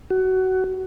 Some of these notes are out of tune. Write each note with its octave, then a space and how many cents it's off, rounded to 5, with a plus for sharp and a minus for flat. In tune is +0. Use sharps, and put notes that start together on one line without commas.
F#4 +20